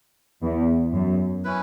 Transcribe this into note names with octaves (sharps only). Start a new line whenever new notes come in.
E2
F#2
C#4 E4 B4